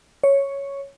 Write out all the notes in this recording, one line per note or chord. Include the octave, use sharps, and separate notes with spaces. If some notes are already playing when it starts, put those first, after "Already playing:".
C#5